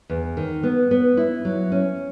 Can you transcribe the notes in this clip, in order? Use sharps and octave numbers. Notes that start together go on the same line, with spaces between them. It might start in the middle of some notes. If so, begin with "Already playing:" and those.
E2
D#3
B3
B3
E4
F#3
C#4